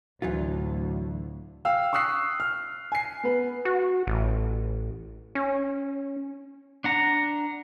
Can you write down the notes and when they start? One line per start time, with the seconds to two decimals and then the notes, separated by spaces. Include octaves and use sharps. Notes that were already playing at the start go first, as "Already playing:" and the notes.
0.22 D2 A2 D3 E3 F#3 F4
1.65 F5 G5 E6
1.93 C#6 D#6 E6 F#6 C7
2.40 F6
2.92 G#5 C7
3.23 B3 B4
3.65 F#4
4.07 A1
5.35 C#4
6.84 D4 F#5 A#5